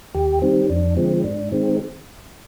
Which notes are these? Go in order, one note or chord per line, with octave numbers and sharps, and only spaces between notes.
D#2 G4
D#3 G3 C4
F2 D4
D3 F3 G#3 C4
G#2 D4
D#3 G#3 C4